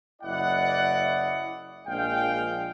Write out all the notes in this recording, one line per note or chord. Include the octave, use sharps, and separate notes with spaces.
F#1 E4 D5 D#5 F#5
A#1 G#3 F5 G5